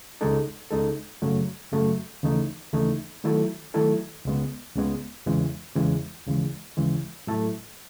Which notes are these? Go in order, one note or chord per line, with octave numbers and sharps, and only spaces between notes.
C#2 C#3 G#3 D#4 A4
C#2 C#3 G#3 D#4 A4
F#2 C#3 F#3 A3
F#2 C#3 F#3 A3
D#2 C#3 E3 A3 D#4
D#2 C#3 E3 A3 D#4
D#3 F#3 A3 E4 A4
D#3 F#3 A3 E4 A4
C#2 C#3 G#3 B3
C#2 C#3 G#3 B3
E2 C#3 E3 G#3
E2 C#3 E3 G#3
D#2 C#3 E3 G#3
D#2 C#3 E3 G#3
A2 F#3 A3 E4 A4